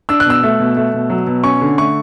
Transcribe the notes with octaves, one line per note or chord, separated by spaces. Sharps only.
D4 E6
F#6
B2 E6
A3
B2
A3
B2
F#3
B2
C#4 C#6
D3
A3 C#6